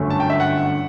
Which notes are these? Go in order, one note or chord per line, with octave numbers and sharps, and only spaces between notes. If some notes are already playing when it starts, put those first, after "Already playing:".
Already playing: G1 F#2 D3 A3 C#4
A5
G5
E5
F#5